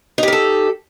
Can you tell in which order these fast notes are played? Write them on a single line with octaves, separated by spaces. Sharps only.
D#4 G4 A#4 A4